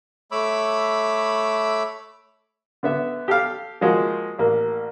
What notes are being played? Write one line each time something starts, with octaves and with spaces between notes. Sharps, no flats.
A3 C#5 B5 D6 E6
D3 B3 E5
G4 A4 F5
F3 G#3 A#3 F#4
A1 A#3